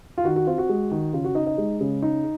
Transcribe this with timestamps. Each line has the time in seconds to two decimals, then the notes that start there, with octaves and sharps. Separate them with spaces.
0.18 F4
0.24 D#3 F#4
0.36 F#4
0.47 C4 F4
0.58 F#4
0.69 G#3
0.91 D#3
1.13 C#3 F4
1.24 F#4
1.35 D#4 D#5
1.46 D#5
1.58 G#3
1.81 C#3
2.02 D#4